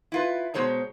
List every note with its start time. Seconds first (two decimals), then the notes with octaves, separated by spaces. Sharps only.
0.12 E4 F4 B4
0.54 B2 G#3 C5 C#5 A#5